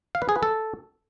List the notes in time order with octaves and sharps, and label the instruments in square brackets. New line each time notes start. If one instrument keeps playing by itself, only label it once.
[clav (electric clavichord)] F5
B4
G#4
B4
A4